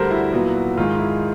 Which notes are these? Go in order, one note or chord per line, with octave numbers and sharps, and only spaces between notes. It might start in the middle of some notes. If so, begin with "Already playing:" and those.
Already playing: D2 D3 G3 A#4 C5
E4 F#4
A#2 F#3 B3
G#2 D#3 G#3 F4
E4